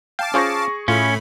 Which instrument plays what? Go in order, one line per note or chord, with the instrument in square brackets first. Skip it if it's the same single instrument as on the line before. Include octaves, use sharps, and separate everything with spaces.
[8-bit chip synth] F5 A5 D6 [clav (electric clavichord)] G5
[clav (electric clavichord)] C#4 F4 C5 [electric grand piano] G#4 C#6 A#6
[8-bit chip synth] A2 A3 B5 [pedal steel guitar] C#4 [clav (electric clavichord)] F4